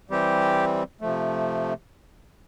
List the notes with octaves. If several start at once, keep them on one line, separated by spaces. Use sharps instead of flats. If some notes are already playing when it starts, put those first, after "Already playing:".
E3 G3 C4 G4
C3 F3 A3